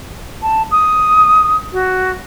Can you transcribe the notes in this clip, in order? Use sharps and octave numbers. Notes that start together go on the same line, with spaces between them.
A5
D#6
F#4